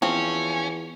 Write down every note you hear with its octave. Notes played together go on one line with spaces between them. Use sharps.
E2 F3 C4 C#4